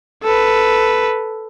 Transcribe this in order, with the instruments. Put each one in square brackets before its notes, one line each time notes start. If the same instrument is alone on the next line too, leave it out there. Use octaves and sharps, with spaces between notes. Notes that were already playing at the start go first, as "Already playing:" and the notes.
[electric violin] A4 B4